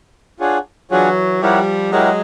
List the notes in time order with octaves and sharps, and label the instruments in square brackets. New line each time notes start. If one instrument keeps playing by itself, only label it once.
[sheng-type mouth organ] D4 F4 G#4 C#5 F#5
[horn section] E3 F#3 [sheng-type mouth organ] D4 F4 G#4 C#5 F#5
[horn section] F3 G3 [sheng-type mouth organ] E4 G4 A#4 C#5 F#5
[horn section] F#3 G#3 [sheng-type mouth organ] E4 G4 A#4 C#5 F#5